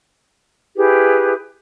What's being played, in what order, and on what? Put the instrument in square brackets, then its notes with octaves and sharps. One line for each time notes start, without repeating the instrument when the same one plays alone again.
[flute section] E4 G4 G#4 B4